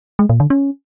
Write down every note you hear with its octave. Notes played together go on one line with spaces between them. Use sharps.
G#3
A#2
D3
C#4